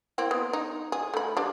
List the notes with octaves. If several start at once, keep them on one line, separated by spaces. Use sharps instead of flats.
A#3 C4 E4
B3
D#4
G#4
A3 B5
G3 D4